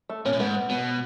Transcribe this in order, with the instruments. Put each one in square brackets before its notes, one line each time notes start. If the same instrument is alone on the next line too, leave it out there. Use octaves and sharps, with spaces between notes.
[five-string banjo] A3
[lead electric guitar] A#2 [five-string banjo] C#4
[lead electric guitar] A2
[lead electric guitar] G#2 [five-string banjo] B3
[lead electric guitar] B2